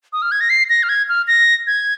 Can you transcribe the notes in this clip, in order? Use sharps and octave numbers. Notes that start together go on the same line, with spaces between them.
D#6
F6
G#6
A#6
C7
A#6
F6
G#6
F6
A#6
G#6